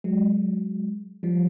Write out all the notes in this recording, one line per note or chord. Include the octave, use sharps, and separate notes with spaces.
F#3 G#3
F3 G3